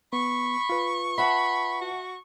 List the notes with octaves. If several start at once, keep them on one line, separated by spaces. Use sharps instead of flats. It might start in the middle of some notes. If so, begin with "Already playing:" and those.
B3 B5 C#6
F4 B4
E5 F#5 A5 B5
F#4